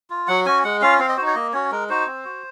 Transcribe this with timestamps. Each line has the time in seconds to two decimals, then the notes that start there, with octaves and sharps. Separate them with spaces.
0.10 F4
0.28 F#3 F#5
0.46 C#4 F#4 G#5
0.64 G#3 F#5
0.82 C#4 F4 F5
0.99 C4 F5
1.09 D#5
1.17 D#4 F#4 C5
1.27 C#5
1.35 A#3 D#5
1.53 C#4 F#4 C#5
1.72 G#3 A#4
1.89 D#4 F#4 C5
2.07 C4
2.25 F#4